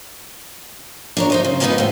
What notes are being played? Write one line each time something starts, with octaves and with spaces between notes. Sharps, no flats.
D4 A#4 C#5
D#4 C5 D#5
C#3
G#3 A#3 B3 D4 D#4 B4
A2 C5